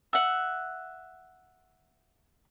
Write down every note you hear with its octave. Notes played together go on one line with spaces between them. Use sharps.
E5 F#5